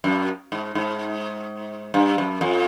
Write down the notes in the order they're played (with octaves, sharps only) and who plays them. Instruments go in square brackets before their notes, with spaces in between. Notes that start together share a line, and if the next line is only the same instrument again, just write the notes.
[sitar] F#2
G#2
G#2
G2
F#2
F2